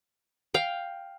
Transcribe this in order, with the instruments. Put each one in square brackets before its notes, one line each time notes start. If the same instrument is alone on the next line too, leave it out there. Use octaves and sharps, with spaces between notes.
[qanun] F5 G5